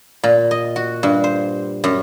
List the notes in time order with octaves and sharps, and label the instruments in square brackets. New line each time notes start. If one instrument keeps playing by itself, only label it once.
[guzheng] A#2
D#5
F#4
G2
C5
F#2